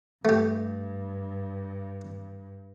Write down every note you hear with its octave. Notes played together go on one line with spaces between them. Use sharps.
G2 A3 G4